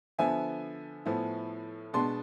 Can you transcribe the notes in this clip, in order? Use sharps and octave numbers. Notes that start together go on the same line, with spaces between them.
D3 F3 B3 E5 G#5
A2 F3 B3 E4
B2 G#3 B3 D4 A5 C6